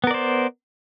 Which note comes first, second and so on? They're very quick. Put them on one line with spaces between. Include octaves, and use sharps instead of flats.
B3 A#4 D5 C5